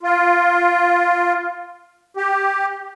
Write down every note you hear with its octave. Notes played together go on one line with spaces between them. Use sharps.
F4
G4